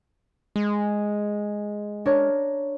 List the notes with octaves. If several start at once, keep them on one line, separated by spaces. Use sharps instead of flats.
G#3
D4 A#4 C#5